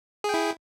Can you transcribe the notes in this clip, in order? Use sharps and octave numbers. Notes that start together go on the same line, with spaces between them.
E4 G#4 G5